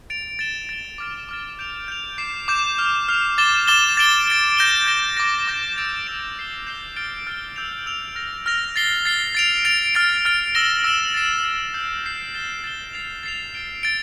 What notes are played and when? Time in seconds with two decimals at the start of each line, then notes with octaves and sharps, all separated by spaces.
0.10 A6 D7 F7
0.39 A6 E7 G7
0.69 A6 E7 G7
0.98 D6 F6 A6
1.29 D6 F6 A6
1.59 G6 D7 F7
1.88 G6 D7 F7
2.18 D6 G6 C7 E7
2.48 D6 G6 C7 E7
2.78 F6 C7 F7
3.08 F6 C7 F7
3.38 D6 A6 E7 G7
3.68 D6 A6 E7 G7
3.97 A6 D7 G7
4.28 A6 D7 G7
4.57 G6 A#6 E7 G7
4.87 G6 A#6 E7 G7
5.17 D6 G6 A#6
5.47 D6 G6 A#6
5.76 E6 A6 D7 F7
6.06 E6 A6 D7 F7
6.36 G6 C7 G7
6.67 G6 C7 G7
6.96 F6 A6 D7 G7
7.27 F6 A6 D7 G7
7.56 E6 G6 D7 F7
7.86 E6 G6 D7 F7
8.15 F6 A#6 F7
8.46 F6 A#6 F7
8.76 A6 C7 G7
9.05 A6 C7 G7
9.35 A6 D7 F7
9.65 A6 D7 F7
9.95 F6 A6 D7
10.25 F6 A6 D7
10.55 E6 A#6 E7 G7
10.84 E6 A#6 E7 G7
11.14 A6 C7 E7
11.44 A6 C7 E7
11.74 E6 G6 C7
12.04 E6 G6 C7
12.34 A6 E7 G7
12.64 A6 E7 G7
12.93 A6 C7 F7
13.23 A6 C7 F7
13.54 A6 D7 G7
13.83 A6 D7 G7